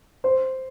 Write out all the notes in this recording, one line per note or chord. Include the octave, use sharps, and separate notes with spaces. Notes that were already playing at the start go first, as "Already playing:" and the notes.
C5